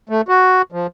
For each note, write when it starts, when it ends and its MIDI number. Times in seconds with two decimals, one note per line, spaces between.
0.09 0.21 57
0.28 0.62 66
0.72 0.87 53